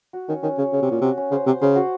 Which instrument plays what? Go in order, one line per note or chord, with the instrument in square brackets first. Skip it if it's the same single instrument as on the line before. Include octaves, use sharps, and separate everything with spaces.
[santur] F#4
[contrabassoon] D#3 [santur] C#4
[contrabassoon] D#3 [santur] C#4
[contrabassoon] C#3 [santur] C#5
[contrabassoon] C#3 [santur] C#5
[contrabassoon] C3
[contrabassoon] A#2 [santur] C#4
[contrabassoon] C3 [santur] F#4
[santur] C#4
[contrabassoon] C#3 [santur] C5
[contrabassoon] C3 [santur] C5
[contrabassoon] C#3 [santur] C5
[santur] F#4